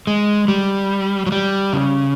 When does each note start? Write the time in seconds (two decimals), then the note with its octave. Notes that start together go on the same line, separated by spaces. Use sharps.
0.07 G#3
0.48 G3
1.26 F#3
1.32 G3
1.73 C#3